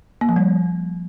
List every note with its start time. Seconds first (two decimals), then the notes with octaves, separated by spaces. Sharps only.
0.21 A#3
0.29 F3
0.36 G3